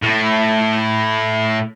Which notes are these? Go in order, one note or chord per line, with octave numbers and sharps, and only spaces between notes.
A2 A3